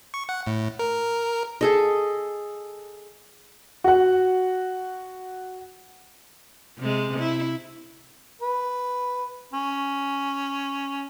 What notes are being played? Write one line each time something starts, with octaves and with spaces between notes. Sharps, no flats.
C#6
F#5
A2
A#4
G#4 A4 D#5
F#4 F#5
C3 G#3
E4
B4
C#4